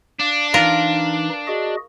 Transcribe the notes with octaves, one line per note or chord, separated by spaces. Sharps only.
D4 F5 D6
E3 D#4 F4 A#4
F#4 G#4 D#5